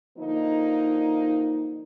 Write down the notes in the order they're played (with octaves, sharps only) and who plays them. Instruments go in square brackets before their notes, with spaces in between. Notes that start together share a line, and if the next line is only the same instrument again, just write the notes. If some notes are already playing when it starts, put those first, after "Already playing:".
[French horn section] D3 F3 A#3 D#4